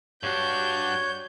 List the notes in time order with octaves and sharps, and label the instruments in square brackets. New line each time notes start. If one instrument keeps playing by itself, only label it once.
[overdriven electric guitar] G2 D4 [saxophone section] F#4 G4 [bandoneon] C#5 [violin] G6